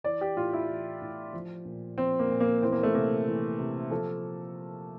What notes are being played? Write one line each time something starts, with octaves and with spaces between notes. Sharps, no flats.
E3 D5
G4
A2 F4
E4
E3
A2
F3
A#2
F3 C4
A#3
A#2
A#3
E3 C4
A#3
A3
C3 A#3
E3
C3
F3 A4